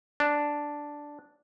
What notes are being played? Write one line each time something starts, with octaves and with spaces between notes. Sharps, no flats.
D4